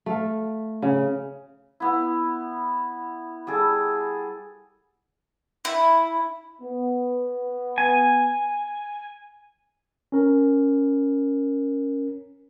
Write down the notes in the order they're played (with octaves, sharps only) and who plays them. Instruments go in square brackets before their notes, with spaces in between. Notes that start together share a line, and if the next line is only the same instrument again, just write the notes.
[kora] A3 F5
C#3
[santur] B3 E4
G3 G#4 A4
[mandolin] E4
[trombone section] B3
[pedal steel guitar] G#5
[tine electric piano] C#4 A#4